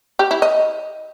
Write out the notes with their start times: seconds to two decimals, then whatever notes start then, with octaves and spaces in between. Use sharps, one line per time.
0.19 G4
0.31 E4
0.42 D#5